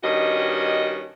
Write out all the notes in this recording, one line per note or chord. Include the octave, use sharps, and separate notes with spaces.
G2 D#3 C#4 F#4 D#5